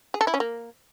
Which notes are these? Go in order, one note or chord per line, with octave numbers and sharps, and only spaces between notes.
G#4
A4
E4
C#4
A#3